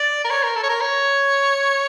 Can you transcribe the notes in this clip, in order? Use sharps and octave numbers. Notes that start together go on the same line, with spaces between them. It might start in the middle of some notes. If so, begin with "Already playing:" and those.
Already playing: D5
A#4
C#5
A#4
A4
C#5
A#4
C#5